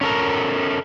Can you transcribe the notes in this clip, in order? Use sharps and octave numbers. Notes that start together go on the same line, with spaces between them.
C#4 A4 A#4